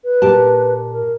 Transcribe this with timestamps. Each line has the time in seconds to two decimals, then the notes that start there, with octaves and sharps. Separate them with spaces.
0.04 B4
0.22 A#2 G4 A5
0.92 A#4